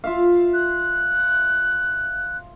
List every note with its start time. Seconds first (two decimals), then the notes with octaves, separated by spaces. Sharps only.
0.04 F4 E5 F5
0.54 F#6